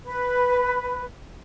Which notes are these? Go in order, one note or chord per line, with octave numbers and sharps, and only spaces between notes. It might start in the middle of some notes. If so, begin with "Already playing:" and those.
B4